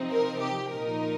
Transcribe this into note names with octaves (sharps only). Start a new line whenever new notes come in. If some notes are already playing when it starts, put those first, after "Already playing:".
Already playing: C3 F3 C4 D#4
A#4
G4
A#2 F3 D#4 A#4